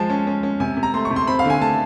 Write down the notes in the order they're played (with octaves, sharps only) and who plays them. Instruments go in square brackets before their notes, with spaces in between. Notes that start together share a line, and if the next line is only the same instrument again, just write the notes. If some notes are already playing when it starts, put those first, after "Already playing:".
Already playing: [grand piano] F3 G#3 A5
C#4
C#4
C#4
C3 G#5
C3
A#5
A3 C6
C#6
C3
C6
C4 B5
F5
D3
G#5
A3 A5